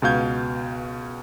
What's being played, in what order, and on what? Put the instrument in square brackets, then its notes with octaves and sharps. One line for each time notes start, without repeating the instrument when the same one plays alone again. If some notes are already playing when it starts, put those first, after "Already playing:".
[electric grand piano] C#2 B2 F5 G6 G#6